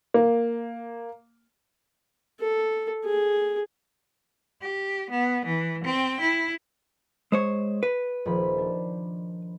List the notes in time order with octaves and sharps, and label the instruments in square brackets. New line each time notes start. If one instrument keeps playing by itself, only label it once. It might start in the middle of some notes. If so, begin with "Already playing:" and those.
[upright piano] A#3
[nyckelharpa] A4
G#4
[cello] G4
B3
E3
C4 G5
E4
[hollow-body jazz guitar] G#3 C5 C#5
B4
[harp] D#1 F3 B5
D4